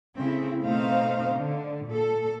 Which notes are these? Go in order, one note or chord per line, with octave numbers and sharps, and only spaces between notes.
C#3 A3 C4 E4
B2 A3 C4 D#4 C5 F5
D3
A#2 A4